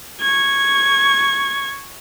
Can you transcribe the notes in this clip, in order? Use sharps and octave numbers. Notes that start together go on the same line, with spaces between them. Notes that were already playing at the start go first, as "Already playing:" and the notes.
C#6 G#6